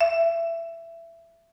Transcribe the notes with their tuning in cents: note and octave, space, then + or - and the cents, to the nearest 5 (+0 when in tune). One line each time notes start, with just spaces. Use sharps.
E5 +20